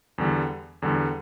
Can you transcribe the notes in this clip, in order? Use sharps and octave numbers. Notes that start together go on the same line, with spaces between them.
E2 D3 G3
E2 D3 G3